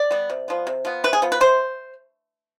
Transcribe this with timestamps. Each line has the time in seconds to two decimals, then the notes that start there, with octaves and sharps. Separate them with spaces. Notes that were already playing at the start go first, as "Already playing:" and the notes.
Already playing: D5
0.11 G3 B3
0.30 C3
0.48 F3 B3
0.67 C3
0.85 F3 B3
1.04 C3 B4
1.13 G#4
1.22 F3 B3
1.32 B4
1.40 C3 C5